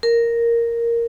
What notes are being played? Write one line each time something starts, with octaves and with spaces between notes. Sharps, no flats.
A#4